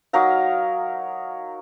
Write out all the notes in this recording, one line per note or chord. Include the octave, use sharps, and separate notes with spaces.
F#3 D#4 A#4 F5